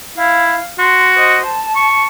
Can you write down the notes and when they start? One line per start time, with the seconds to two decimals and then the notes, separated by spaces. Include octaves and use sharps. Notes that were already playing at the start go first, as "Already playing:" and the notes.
0.18 E4 F5
0.79 F#4 C6
1.15 C5 D#5
1.45 A5
1.76 C#6